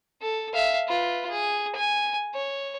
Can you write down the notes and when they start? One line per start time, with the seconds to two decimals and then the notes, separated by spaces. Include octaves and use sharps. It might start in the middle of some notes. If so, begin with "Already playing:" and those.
0.22 A4
0.53 E5 F5
0.88 F4 B4
1.30 G#4
1.75 G#5
2.34 C#5